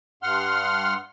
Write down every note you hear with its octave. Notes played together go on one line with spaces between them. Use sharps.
G2 F#5 C6 F6